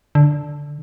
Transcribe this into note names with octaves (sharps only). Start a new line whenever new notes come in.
D3